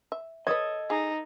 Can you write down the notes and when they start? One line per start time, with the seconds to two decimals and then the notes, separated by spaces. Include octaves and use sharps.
0.12 E5
0.47 A4 B4 C#5 D#5 D#6 G#6
0.90 D#4 G#4